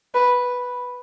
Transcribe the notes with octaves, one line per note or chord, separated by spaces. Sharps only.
B4